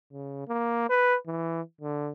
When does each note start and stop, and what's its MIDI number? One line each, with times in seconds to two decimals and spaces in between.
0.13 0.47 49
0.48 0.87 58
0.90 1.16 71
1.27 1.61 52
1.81 2.12 50